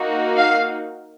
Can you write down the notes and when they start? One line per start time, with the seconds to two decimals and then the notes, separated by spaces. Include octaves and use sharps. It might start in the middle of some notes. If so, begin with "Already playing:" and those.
Already playing: A#3 D#4 F#4
0.37 F5